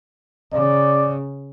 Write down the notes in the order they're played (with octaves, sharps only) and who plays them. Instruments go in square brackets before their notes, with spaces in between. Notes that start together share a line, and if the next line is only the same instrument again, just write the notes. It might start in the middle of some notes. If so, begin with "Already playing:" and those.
[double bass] C#3 [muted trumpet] D5